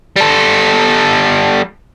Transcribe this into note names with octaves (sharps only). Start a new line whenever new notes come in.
G3 A4